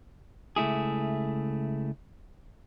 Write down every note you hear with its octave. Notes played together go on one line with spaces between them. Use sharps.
C#2 A3 E4 G#4